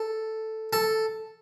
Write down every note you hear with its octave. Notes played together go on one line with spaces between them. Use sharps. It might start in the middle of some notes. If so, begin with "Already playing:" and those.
Already playing: A4
A4